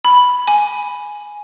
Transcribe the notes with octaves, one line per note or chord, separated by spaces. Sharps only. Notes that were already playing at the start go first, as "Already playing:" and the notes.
B5
G#5